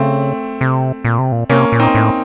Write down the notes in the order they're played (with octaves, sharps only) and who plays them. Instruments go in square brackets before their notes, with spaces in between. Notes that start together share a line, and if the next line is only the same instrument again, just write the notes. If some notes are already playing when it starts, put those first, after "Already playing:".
Already playing: [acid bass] C#3 [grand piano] A3 C4
[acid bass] C3
A#2
C3
A#2
[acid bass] C3 [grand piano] A#3 C#4
[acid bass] A#2
[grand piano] C4 D#4
[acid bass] A2